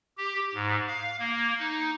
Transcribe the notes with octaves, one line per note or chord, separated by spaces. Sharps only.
G4
G#2
F5
A#3
D#4